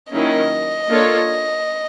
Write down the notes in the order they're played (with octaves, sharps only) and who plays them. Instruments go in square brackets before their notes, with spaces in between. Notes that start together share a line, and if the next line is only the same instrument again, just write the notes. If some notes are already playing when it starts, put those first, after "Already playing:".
[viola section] D#3 F#3 A#3 C#4 E4 [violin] D#5
[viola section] A#3 D4 F4 A4 C#5